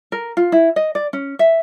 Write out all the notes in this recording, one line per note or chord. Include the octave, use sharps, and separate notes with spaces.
A#4
F4
E4
D#5
D5
C#4
E5